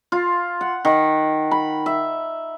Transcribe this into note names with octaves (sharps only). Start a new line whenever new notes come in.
F4
F#5
D#3
B5
E5